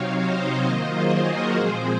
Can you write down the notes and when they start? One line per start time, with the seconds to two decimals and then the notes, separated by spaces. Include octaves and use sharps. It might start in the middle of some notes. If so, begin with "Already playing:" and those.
Already playing: C3 F#3 C4 D#4 C#5 F5
0.17 C5 D#5
0.62 D#3 F#3 A#3 F4 C5 D#5
0.94 F4 G#4
1.23 F#4 A#4
1.54 A#2 F3 G#3 C4 G#4 C5